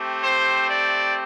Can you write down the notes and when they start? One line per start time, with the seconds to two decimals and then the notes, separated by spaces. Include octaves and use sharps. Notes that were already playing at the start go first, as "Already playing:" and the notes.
Already playing: A3 C4 G4
0.22 C5
0.70 D5